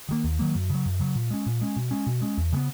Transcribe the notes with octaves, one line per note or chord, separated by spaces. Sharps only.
D#3 F#3 A#3
D#2
D#3 F#3 A#3
F#2
C#3 F#3
F#2
C#3 F#3
A#2
G#3 C#4
A#2
G#3 C#4
B2
G#3 C#4
B2
G#3 C#4
E2
C#3 G#3 B3